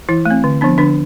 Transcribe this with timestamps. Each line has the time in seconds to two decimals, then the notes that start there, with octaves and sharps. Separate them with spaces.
0.09 E3 E4
0.26 A3 C4
0.44 D3
0.61 F3 B3 D4
0.78 D3 D4